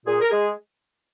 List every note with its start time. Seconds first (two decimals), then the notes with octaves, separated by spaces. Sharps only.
0.05 A#2 G#4
0.21 A#4
0.30 G#3 G#4